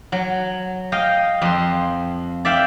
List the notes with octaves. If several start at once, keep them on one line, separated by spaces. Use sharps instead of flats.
F#3
D#5 F5 G5
F2 C6
D5 E5 F5 G5